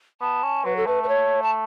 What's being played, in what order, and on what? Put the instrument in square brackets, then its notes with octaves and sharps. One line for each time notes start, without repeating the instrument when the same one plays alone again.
[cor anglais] B3 [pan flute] A5
[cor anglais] C#4
[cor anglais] F#3 [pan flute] B4
[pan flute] A4
[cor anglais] A3 [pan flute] B4
[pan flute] B4
C#5
A5